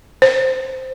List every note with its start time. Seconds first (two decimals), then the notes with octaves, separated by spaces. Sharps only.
0.22 C5